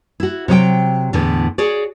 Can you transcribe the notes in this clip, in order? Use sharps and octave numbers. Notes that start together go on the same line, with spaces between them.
E4 F#4
C3 F#3 D#5 G5
E2 A2 D3 B3
F#4 G#4 C#5 D5